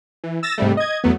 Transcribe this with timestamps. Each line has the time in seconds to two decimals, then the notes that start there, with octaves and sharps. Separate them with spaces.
0.24 E3
0.43 E6 A6 A#6 E7
0.58 G#2 C3 G3 A3
0.77 D#5 G#6
1.04 E2 F#3 A3 B3